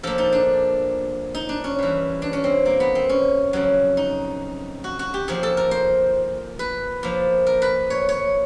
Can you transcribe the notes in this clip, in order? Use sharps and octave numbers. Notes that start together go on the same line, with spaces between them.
A#2 F3 A4
D#4
D4
D#4
D4
C#4
G2 E3
D4
C#4
C4
A#3
B3
C4
C#4
F2 C#3 F#3
D#4
F#4
F#4
G4
A#2 F3 G#4
A4
A#4
C5
B4
A#2 F3
A#4
B4
C#5
C#5